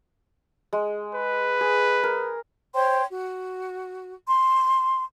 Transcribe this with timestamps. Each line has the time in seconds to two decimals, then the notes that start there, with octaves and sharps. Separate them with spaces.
0.73 G#3
1.14 B4
1.61 G#4
2.03 A#4
2.74 C5 C#5 G5 C6
3.10 F#4
4.27 C6